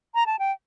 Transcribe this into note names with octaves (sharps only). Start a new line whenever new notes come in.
A#5
A5
G5